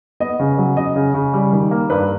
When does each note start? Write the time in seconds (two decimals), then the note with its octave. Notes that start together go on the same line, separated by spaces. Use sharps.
0.20 B3 D#5
0.40 C#3
0.58 F#3
0.77 C#3 D#5
0.96 C#3
1.14 C#3
1.33 G3
1.52 D#3
1.71 A#3
1.90 G2 B4